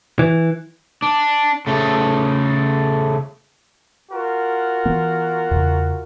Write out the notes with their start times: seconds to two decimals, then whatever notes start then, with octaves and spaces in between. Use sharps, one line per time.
0.19 E3
1.02 D4
1.67 C#3 A3
4.12 F4 F#4 A#4
4.85 E3 B3
5.51 E2 C#3